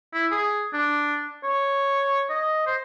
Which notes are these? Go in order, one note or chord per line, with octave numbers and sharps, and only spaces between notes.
E4
G#4
D4
C#5
D#5
C5